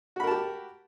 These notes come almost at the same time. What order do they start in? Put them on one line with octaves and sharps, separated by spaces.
F#4 B5 A#4 A5 G4